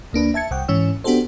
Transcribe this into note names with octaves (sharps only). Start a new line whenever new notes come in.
D2 A#3 D4 B4
E5 A5 G#6 C#7
C2 F#5 G5
G#2 E3 C#4 C#5 E6
B3 D4 F#4 G4 A4 C5